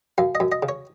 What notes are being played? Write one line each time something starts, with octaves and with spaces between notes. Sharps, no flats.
F#2 F5
D#5
F#2
D#5
C#3
C#5